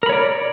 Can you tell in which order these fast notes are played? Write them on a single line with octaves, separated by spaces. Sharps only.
A#4 B5 C#5 D5